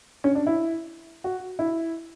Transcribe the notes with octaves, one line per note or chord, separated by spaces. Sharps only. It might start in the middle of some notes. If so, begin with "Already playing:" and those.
C#4
D4
E4
F#4
E4